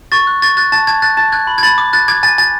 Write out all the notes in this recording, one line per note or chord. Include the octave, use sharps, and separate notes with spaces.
C#6 A6
F#6
C#6 A6
F#6 A6
A5 A6
A5 G#6
F#6 A6
A5 A6
F#6 G#6
B5
G#6
B5 A6
D6
F#6 A6
D6 G#6
G#5 A6
G#5 A6